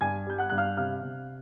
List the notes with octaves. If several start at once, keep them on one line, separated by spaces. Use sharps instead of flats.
G2 G#5 G#6
G3 G6
F#5 F#6
G2 F#6
F5 F6
C3 F5 F6
C3